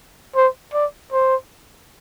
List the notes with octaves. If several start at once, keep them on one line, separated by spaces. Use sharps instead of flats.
C5
D5
C5